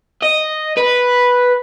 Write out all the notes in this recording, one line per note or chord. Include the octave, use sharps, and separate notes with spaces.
D#5
B4